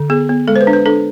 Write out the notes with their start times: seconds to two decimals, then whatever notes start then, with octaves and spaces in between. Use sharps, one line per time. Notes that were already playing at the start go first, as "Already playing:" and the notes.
Already playing: D3
0.10 B3 G#4
0.29 B3
0.48 G#3 A4
0.56 C5
0.61 B4
0.67 D4
0.73 B4
0.86 D4 A4